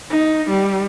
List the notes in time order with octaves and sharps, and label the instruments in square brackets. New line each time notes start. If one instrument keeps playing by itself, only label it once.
[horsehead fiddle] D#4
G3